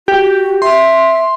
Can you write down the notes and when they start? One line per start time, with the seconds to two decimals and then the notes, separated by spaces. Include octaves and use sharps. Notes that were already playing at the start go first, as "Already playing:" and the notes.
0.08 F#4 G4
0.62 E5 C6